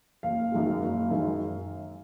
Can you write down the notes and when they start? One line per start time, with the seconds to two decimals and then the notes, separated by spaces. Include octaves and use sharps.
0.23 F#1 F5
0.52 F#2 D#3 G#3
0.82 F#1
1.10 F#2 D#3 G#3